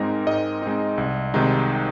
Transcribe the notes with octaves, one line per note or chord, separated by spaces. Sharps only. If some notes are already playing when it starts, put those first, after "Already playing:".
Already playing: G#2 G#3 C4 D#4 A#4
G#2 D#5
G#3 C4 D#4
C2
C3 D#3 G#3 D#4